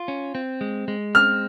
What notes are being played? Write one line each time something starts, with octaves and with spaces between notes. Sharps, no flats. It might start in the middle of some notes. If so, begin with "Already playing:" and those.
Already playing: F4
C#4
C4
G#3
G#3
C4 F6